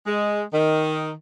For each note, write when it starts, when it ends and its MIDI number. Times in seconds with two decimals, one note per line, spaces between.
0.06 0.43 56
0.53 1.12 51